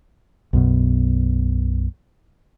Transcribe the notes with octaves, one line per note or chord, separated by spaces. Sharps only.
B1 F#2 B2